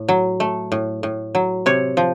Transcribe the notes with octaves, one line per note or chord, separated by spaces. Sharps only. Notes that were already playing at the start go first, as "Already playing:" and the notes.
Already playing: A2
F#3
A3
A2
A2
F#3
C3 C#5
F3